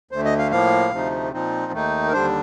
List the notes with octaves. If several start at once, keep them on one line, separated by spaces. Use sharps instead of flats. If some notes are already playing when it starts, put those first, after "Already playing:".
D2 D3 A3 C5
D#5
F5
A2 F3 A#3 F5
D2 C3 F3 A3 D#4
A#2 F3 C4 D#4
D#2 D#3 A3 D#4
A#4
D#2 D3 G3 D4 C5